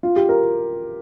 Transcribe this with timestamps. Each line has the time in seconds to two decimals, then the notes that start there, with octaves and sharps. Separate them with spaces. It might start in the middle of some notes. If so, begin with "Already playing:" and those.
0.03 F4
0.16 G4
0.29 A#4